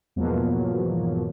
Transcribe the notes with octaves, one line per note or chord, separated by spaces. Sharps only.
E2 G#2 B2 F3 F#3 A#3